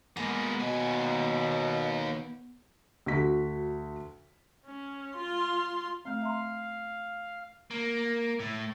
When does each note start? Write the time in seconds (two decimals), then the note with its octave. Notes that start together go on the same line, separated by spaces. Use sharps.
0.17 G#3 A#3 B3
0.60 D#2 B2 G#5
3.06 D2 F#4 B6
4.66 C#4
5.16 F4 C6
6.05 A3 C4 F5
6.22 E5 A#5 C6
7.71 A#3
8.40 A2